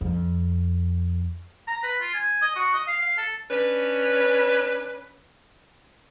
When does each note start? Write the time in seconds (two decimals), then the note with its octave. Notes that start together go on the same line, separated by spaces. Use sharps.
0.01 F2
1.68 A#5
1.83 B4
2.01 F4
2.14 G#5
2.42 D#5
2.56 F#4
2.74 D#5
2.88 F5
3.02 F5
3.18 A4
3.51 C#4 D4 B4